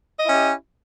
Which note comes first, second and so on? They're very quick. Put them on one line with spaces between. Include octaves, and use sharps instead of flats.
D#5 E4 C#4 G4